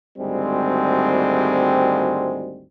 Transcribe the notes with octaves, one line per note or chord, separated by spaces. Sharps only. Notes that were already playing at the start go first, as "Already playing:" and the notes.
G#1 D2 G3 G#3 C4